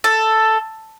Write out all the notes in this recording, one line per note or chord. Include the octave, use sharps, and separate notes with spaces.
A4